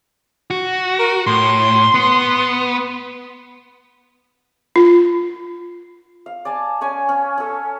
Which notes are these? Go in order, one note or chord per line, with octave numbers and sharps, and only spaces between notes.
F#4
A#4
A2 C6
B3
F4
F5
D5 G#5 A5
C#4 C#5 G#5
C#4
C#4 A4